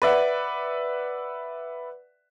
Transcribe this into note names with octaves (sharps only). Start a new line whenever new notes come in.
B4 D5 E5 F#5